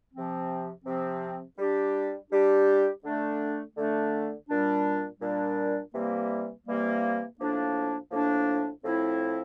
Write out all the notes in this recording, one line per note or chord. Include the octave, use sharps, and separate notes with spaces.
C3 F3 C4
C3 F3 C4
G3 D4 G4
G3 D4 G4
D3 A3 D4
D3 A3 D4
A#2 G3 D4
A#2 G3 D4
C3 E3 G3 A#3
C3 E3 G3 A#3
A2 F3 A#3 D4
A2 F3 A#3 D4
A2 F3 C4 E4